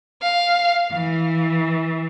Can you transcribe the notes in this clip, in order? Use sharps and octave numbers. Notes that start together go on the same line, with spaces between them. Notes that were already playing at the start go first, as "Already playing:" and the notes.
F5
E3